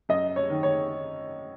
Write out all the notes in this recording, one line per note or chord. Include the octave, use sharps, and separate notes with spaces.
F#2 D#5
C#5
D#3
C#5